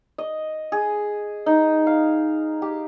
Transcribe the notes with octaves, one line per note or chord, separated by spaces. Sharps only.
D#5
G#4
D#4
F5
G4